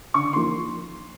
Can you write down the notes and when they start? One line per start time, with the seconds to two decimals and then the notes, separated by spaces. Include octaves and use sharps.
0.14 D3 C#6
0.33 F3 A#3 D#4 C6